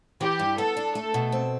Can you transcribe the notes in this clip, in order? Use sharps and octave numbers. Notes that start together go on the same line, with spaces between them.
E3 G4
G2
B3 A4
D4
A3 A4
B2
C4